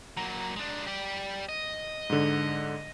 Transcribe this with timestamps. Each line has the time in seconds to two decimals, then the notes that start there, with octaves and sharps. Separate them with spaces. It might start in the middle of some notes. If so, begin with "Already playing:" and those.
0.17 F#3 A#3 A#5
0.56 G#3 D4
0.87 G4 D5
1.49 D#5
2.10 G#2 D3